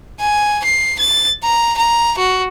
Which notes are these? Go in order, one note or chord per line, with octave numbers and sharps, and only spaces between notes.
G#5
C7
A6
A#5
A#5
F#4